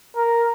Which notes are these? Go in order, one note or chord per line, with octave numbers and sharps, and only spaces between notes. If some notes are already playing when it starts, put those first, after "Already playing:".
A#4